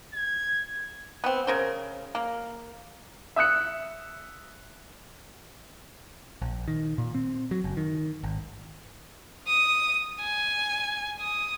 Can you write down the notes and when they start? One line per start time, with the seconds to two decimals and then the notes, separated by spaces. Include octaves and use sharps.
0.14 G#6
1.24 B3 C4
1.47 C#3 A#4 C5
2.15 A#3
3.36 E5 D#6 F#6 C#7
6.42 A#1
6.68 D#3
6.98 A#2
7.15 C4
7.51 F#3
7.64 F#1
7.77 D#3
8.23 G#1
9.47 D#6
10.21 G#5
11.20 D#6